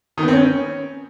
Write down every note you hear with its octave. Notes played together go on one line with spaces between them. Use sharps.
D#3
B3
C4
C#4